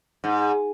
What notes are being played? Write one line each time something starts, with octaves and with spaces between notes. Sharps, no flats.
G#2